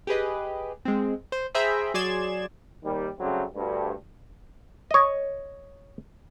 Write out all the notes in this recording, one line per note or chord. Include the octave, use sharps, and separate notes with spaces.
G4 G#4 B4 D#5
G#3 C4
C5
G#4 C5 E5 G5 A#5 B5
F#3 G#4 D5 C6 G#6 E7
D#2 D#3 G3
C#3 F#3 G3 A3 C4
D2 G2
C#5 D#5